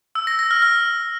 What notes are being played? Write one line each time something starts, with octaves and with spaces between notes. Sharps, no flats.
E6
A#6
A#6
F6
F6